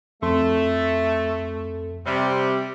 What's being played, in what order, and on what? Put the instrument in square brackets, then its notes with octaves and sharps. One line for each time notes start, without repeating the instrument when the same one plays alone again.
[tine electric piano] F2 A4 C6 [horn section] A3
[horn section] C3 G3